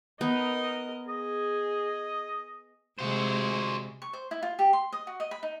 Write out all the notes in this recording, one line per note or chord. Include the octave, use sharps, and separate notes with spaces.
B3 D#4 A#4 D#5
G#4 D#5
C3 G#3 F#4 C5
C#6
C5
E4
F4
G4
C6
D#5
F#4
D#5
B5
D#4